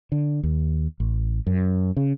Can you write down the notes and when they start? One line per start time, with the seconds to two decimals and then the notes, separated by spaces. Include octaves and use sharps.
0.12 D3
0.43 D#2
1.00 A1
1.47 F#2
1.97 C#3